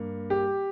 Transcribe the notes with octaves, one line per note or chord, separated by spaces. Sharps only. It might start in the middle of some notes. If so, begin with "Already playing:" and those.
Already playing: G2 A#3
G4